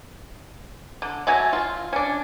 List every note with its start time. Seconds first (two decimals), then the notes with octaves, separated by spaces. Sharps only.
1.02 D3
1.27 F#3 A3 F#4 G#5
1.53 F4
1.93 C#4 D4